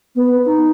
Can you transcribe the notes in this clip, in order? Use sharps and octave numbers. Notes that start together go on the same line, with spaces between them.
B3
D#4